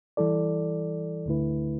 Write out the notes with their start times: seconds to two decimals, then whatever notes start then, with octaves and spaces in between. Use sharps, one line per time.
0.17 E3 G3 E4 A4 D5
1.26 D2 D3 A3 E4 B4